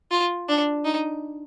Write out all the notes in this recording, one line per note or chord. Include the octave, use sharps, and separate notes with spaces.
F4
D4
D#4